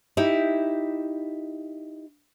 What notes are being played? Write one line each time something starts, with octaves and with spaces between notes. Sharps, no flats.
D#4 E4 G4